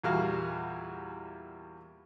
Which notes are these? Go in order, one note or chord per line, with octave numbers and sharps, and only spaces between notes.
E2 A#2 G3 F#4 F5